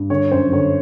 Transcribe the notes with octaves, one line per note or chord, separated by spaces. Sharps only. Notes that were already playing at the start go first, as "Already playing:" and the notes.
Already playing: G2
D3 C#5
F#2 C5
D3 C#5